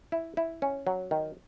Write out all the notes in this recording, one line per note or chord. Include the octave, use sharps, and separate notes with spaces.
E4
E4
C#4
F#3
D#3